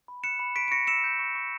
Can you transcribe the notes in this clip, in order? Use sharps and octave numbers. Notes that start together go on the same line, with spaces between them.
B5
F#6 C#7 E7
B5
C#6 B6 D7
D7
C#6 A#6 C#7
E6 C#7 E7
G6
C#6
C#6